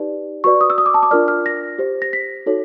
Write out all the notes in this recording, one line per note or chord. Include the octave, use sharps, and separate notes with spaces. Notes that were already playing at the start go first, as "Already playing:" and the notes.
Already playing: D#4 G4 B4 D5
F#4 B4 D5 C#6
D#6
E6
D#6
D6
A5
D6
D4 F4 A#4 D5 F6
F6
A#6
G4 C5
A#6
B6
D#4 F#4 A4 C#5